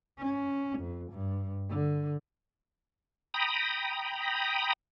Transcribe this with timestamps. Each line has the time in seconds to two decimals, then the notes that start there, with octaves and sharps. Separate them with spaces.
0.19 C#4
0.79 F2
1.12 G2
1.69 D3
3.34 G5 A#5 B5 D#6